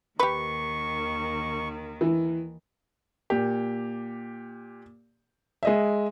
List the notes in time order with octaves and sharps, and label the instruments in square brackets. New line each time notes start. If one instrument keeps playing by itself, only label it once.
[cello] D#2 D#3 [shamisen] G4 B4 [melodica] C#6
[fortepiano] E3
[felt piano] A#2 G4
G#3 D#5 E5